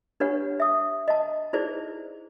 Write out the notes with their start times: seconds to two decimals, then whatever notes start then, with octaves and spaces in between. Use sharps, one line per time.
0.20 D4 G4 B4 C#5 F#5
0.60 E5 D#6
1.08 D#5 A5
1.53 D#4 E4 G#4 B4 C5 D5